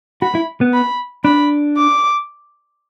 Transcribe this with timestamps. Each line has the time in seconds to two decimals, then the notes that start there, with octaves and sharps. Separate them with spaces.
0.22 F#4 B5
0.35 E4
0.61 B3
0.73 B5
1.24 D4 B5
1.77 D6